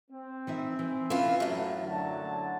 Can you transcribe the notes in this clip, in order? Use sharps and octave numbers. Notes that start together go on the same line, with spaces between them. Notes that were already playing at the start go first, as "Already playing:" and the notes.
C4
E3 D#4 E5
E3
E3 C#4 F4
F#2 A2
D3 F#3 A5